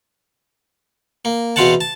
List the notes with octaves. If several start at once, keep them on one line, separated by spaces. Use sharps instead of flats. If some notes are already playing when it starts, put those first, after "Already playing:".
A#3
E2 B2 C4 F5 F#5 A5
A5